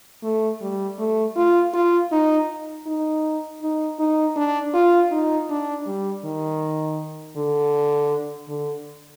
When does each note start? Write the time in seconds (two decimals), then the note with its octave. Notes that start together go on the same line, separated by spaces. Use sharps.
0.23 A3
0.62 G3
0.99 A3
1.36 F4
1.74 F4
2.12 D#4
2.87 D#4
3.62 D#4
3.99 D#4
4.36 D4
4.74 F4
5.12 D#4
5.50 D4
5.87 G3
6.24 D#3
7.37 D3
8.49 D3